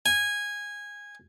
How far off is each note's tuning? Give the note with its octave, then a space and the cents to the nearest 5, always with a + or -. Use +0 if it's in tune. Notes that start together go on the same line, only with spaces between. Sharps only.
G#5 -15